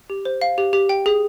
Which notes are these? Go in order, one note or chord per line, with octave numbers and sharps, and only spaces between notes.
G4
C5
F5
G4
G4
G5
G#4